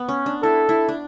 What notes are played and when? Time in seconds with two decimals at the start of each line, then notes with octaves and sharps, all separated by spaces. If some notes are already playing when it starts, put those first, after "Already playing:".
Already playing: B3
0.08 C#4
0.26 D4
0.43 E4 A4
0.69 E4
0.89 D4